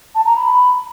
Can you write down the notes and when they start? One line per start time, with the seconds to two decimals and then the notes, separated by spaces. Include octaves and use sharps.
0.15 A5
0.26 A#5
0.36 B5